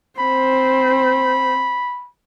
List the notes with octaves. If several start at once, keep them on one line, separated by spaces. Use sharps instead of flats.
C4 C5 B5